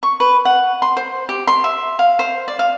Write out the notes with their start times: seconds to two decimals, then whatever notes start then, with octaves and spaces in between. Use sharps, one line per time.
0.03 C#6
0.20 B4
0.45 F#5
0.82 C6
0.97 C5
1.29 G4
1.47 C6
1.64 E5
1.99 F5
2.19 C5
2.48 D5
2.59 F5